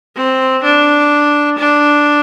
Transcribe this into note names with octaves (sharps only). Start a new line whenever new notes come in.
C4
D4
D4